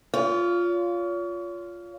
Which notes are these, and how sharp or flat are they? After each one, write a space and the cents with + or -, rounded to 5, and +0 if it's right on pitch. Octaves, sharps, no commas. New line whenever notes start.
F4 +0 C#5 +40